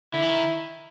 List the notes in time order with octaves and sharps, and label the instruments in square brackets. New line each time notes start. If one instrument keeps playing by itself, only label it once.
[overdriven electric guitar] D3 [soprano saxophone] E4
[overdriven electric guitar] E3
D#3